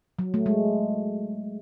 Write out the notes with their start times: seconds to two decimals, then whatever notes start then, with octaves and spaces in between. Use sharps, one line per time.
0.19 F#3
0.34 A3
0.46 G#3